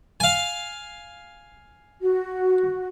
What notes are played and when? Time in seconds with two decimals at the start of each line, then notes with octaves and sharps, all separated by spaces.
0.20 F5 G#5
2.01 F#4